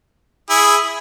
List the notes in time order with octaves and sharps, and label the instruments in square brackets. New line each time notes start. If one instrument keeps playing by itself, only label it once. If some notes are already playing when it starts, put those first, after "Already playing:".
[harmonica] E4 G#4